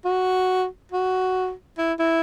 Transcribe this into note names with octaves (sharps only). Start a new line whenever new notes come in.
F#4
F#4
E4
E4